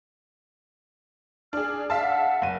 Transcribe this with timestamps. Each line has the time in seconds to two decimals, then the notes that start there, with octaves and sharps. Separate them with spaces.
1.53 D4 G#4 F6
1.90 E5 F5 A5
2.03 F#5
2.42 F#1 D#7